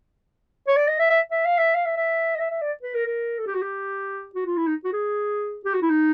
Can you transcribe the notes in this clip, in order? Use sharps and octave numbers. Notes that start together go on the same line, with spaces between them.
C#5
D5
D#5
E5
E5
E5
F5
E5
F5
E5
E5
D#5
E5
E5
D5
B4
A#4
A#4
A4
G4
F#4
G4
F#4
F4
E4
D#4
F#4
G#4
G4
F#4
E4
D#4